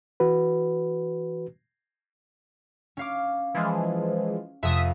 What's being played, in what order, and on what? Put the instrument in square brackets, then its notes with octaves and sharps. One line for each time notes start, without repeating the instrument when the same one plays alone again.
[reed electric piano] E3 F#4 B4
[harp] C#4 F5 D6
[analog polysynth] E3 F3 G#3
[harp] F1 F2 [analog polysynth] E5 D#6